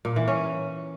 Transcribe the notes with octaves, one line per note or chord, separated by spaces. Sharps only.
A#2
E3
C#4